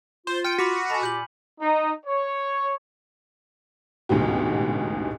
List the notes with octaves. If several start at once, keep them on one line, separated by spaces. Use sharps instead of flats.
F4 C5
G5 F6 C#7 D#7
F#4 B5 D6 B6
A4 D#5 G#5 A5 B5
A#2 F4 G4 G6 F#7
D#4
C#5
A1 D2 G#2 B2 G4